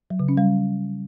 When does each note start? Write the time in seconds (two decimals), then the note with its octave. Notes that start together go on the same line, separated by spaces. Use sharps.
0.10 F#3
0.19 C#3
0.28 C#4
0.38 G3